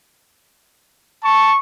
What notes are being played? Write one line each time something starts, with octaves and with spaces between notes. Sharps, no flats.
A5 C#6